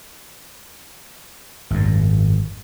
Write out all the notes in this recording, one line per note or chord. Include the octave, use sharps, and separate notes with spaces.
G#1 F#2